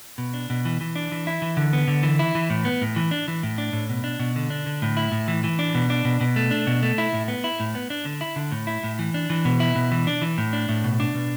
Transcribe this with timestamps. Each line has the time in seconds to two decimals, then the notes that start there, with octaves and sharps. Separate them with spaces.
0.18 B2
0.34 D4
0.50 B2
0.65 E3
0.81 E3
0.96 D4
1.12 E3
1.27 E4
1.42 E3
1.57 D3
1.73 B3
1.88 D3
2.03 E3
2.19 E4
2.35 E3
2.50 A2
2.65 B3
2.81 A2
2.96 E3
3.11 D4
3.28 E3
3.43 A2
3.58 D4
3.73 A2
3.89 B2
4.04 D4
4.20 B2
4.36 D3
4.50 D4
4.66 D3
4.82 A2
4.97 E4
5.12 A2
5.28 E3
5.44 E3
5.59 D4
5.75 B2
5.90 D4
6.05 B2
6.21 B2
6.36 A3
6.51 D4
6.67 B2
6.83 A3
6.98 E4
7.13 A2
7.28 B3
7.44 E4
7.60 A2
7.75 B3
7.90 D4
8.05 D3
8.21 E4
8.36 D3
8.52 A2
8.67 E4
8.84 A2
8.99 E3
9.14 D4
9.30 E3
9.45 B2
9.60 E4
9.76 B2
9.92 E3
10.07 D4
10.22 E3
10.38 A2
10.53 D4
10.69 A2
10.84 B2
11.00 D4
11.15 B2